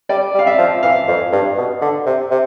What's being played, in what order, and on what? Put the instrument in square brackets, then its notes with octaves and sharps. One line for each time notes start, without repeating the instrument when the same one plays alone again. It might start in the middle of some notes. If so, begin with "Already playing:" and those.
[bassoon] G3 [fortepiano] D5
[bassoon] G3
[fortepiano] F5
E5
[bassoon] F3
[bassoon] E3 [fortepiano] F5
[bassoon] F2
G2
B2
D3
C3
C3